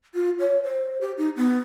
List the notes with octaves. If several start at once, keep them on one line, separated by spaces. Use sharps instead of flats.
F4
C#5
C5
G4
D#4
B3